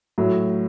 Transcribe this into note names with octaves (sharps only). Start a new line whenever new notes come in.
A2 F#3 A3